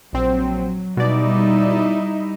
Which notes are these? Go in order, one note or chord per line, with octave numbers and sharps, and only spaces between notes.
A#1 F#3 C4
B2 G3 D#4 E4 D5